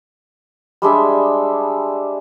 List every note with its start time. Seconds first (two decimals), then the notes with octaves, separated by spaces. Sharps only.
0.82 G3 G#3 D4 E5